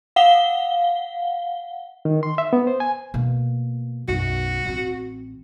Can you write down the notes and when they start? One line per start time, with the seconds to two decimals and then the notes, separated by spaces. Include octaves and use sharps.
0.16 F5 F#5 G7
2.05 D#3
2.23 C6
2.38 E5
2.53 B3
2.67 C5
2.80 G#5
3.14 B2 A#3
4.08 B1 F#2 F#4
4.66 A1 C4